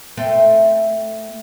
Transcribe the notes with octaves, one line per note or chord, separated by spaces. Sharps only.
A3 C4